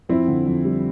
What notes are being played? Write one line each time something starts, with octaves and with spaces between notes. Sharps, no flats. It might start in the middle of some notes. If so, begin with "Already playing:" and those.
F2 C4 E4
D3
F2
G3